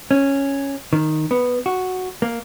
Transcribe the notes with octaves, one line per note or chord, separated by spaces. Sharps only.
C#4
D#3
B3
F#4
A#3